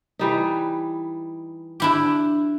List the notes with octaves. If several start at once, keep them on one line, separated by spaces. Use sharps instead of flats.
E3 G3 D#4
D4 E4 G4